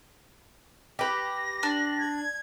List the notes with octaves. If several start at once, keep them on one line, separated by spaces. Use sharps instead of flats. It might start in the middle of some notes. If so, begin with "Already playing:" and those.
G4 B4 A#6
D4
G#6